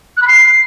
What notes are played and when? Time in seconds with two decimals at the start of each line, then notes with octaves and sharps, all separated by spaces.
0.17 F#6
0.22 B5
0.28 C7